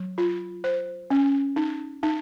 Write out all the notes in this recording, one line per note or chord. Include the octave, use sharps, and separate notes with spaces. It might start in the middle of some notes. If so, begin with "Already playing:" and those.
Already playing: F#3
F4
C5
C#4
D#4
D#4